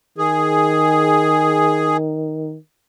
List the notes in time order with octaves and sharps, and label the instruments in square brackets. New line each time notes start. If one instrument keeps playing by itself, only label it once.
[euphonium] D#3 [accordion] G#4